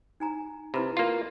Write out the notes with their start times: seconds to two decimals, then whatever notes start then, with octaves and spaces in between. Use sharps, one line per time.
0.20 D#4 G#5 A#5
0.74 C3 E4 B4 B5
0.97 A#3 F4